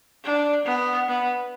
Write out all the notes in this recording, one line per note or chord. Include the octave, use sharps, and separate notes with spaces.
D4
B3
B3